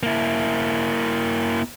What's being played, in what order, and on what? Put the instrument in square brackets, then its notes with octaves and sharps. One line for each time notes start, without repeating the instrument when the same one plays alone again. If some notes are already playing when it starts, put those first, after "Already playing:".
[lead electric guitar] A#3 E4